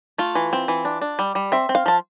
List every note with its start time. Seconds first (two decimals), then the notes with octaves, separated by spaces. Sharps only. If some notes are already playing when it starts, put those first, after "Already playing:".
0.18 A3 F4
0.35 E3
0.53 C4
0.68 E3
0.85 D4
1.01 D4
1.19 G3
1.35 G3
1.52 C4 E5
1.69 C4
1.75 F5
1.86 F3 A5